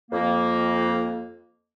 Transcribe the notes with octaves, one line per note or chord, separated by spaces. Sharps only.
F2 A#3